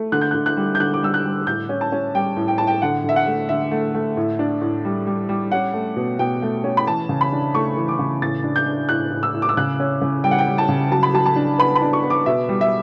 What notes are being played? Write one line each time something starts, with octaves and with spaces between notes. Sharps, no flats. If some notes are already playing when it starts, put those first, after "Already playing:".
Already playing: A3
D3 F#6
G6
D3 F#6
F#6
G3
G6
D3 F#6
D6
G3 E6
F#6
G3
A2 G6
C#4
A5
C#4
G3 G5
A2
G5
A2 A5
G5
D3 F#5
D3 E5
F#5
A3
D3 E5
A3
A3
A2
D4
A2
G3
G3
G3
C#4 F#5
A3
B2
B2 G5
A3
C#4
B5
E3 A5
C#3
B5
D4
A3 C#6
E3
D6
C#3
A2 A6
D4
G6
D4
A2 F#6
A2
E6
A2
D6
E6
C#3 F#6
C#4
C#3
G3 G5
F#5
G5
G3
A5
C#3
F#3 A5
B5
F#3 A5
A5
D4
B3 B5
B5
D4
C#6
B3
D6
B2 E5
G3
E5